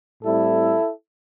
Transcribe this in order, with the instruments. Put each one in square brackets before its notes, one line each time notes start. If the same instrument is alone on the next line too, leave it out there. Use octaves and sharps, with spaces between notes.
[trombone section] A2 G3 C4 E4 A4